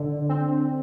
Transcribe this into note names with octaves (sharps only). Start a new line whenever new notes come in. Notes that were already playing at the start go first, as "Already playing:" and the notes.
Already playing: D3
C4